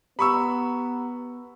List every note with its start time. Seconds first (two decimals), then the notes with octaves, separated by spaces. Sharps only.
0.19 B3 G4 A#5 B5 C#6 E6